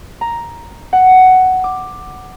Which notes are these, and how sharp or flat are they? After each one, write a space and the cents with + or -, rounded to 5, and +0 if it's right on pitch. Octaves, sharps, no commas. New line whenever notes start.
A#5 +5
F#5 +10
D6 +10